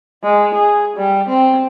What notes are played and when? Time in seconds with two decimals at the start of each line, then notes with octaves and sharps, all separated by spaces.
0.23 G#3
0.54 G#4
0.96 G3
1.29 C4